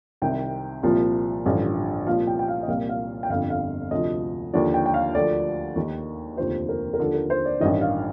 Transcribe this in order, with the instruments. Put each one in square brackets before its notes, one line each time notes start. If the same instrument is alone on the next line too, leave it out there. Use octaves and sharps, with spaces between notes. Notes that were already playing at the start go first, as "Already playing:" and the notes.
[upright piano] C2 C3 D#3 G5
C2 A#2 F3
A1 G2 D3 F3
C2 A#2 F3 F5
G5
G5
F5
D#5
C2 A#2 F3 F5
F5
G5
G1 F2 D3 F5
F5
D2 C3 F3 D#5
D#2 D3 F3 D5
G5
G5
F5
D2 D3 F3 D5
D#2 D#3
F1 D#2 D3 F3 C5
A#4
A#4
D#2 D3 F3 A4
A#4
C5
D5
A1 G2 D#3 D#5
F5